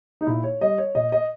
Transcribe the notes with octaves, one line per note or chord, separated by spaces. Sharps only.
D#4
A#2 E4
C#5
G3 D#5
C#5
A#2 D#5
D#5